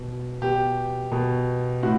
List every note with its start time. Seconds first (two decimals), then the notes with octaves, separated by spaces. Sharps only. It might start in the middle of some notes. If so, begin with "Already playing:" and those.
Already playing: B2
0.42 B2 G4
1.12 B2
1.83 A2 F#4